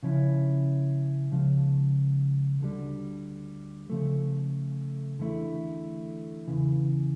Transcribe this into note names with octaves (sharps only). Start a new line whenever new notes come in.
C#3 F3 C#4 E4
C#2 C#3 F3
D2 D3 G3
C#3 F3 A3
E2 D3 A3 E4
E2 C#3 E3